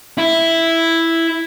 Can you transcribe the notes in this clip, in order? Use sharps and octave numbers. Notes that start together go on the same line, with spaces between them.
E4